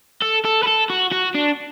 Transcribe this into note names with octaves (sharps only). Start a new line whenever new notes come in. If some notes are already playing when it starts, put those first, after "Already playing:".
A4
A4
B4
A4
F#4
F#4
D4